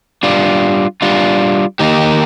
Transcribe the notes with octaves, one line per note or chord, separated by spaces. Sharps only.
G3 D4 F4
G3 D4 F4
D#3 A#3 D#4 G4